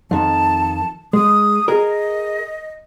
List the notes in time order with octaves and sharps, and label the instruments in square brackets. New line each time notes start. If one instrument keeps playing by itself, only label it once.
[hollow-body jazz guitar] F2 D#3 [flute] A5
[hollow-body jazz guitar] G#3 [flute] D#6
[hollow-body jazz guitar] G#4 A#4 [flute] D#5